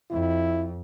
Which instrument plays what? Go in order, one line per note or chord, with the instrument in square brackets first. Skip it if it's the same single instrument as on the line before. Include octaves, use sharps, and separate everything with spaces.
[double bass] F2 [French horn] E4